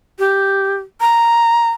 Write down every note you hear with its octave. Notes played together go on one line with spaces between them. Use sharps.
G4
A#5